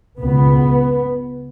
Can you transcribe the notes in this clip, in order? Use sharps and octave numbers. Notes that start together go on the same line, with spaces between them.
C#2 B2 B3